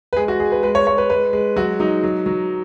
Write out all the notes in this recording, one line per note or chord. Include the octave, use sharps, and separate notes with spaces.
B4
G#3 G#4
F#4
G#3 G#4
B4
G#3 B4
C#5
G#3 C#5
B4
G#3 B4
G#3
F#3 F#4
F#3 D#4
F#3
F#3